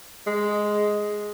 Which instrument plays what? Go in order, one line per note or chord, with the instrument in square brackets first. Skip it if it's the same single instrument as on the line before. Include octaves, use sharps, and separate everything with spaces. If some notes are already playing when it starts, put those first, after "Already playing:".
[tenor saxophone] G#3